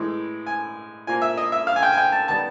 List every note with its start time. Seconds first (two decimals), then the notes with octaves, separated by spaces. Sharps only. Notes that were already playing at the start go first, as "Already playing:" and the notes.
Already playing: A2 E3 G#3
0.47 G#5
1.07 A#2 F3 A#3 G#5
1.22 E5
1.37 D#5
1.52 E5
1.67 F5
1.76 G#5
1.83 G5
1.92 G#5
1.97 G5
2.12 A5
2.28 D#3 G3 B3 A5